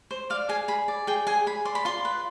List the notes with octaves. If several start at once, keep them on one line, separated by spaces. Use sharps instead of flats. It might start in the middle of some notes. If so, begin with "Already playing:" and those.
C5
D5 F5
G#4 G#5
G#4 B5
D5
G#4 G5
G#4 G#5
G#4 B5
D5 C6
B5
F4 C6
B4